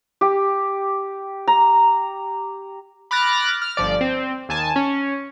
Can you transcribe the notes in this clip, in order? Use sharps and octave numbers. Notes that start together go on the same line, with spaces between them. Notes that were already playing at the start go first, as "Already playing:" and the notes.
G4
A#5
B5 D6 F6 F#6 A6 A#6
F6
G1 F3 D5
C4
D#2 G#5 A5
C#4